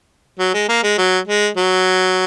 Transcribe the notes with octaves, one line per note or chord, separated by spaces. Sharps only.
F#3
G#3
A#3
G#3
F#3
G#3
F#3